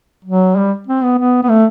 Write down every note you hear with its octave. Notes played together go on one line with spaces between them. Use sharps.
F#3
G3
C4
B3
B3
B3
A3